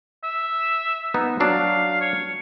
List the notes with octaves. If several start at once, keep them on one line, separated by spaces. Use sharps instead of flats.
E5
B3 D#4
F#3 D4 F5
C#5